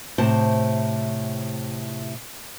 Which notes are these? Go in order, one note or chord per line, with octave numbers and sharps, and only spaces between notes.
A2 C3 C5 A5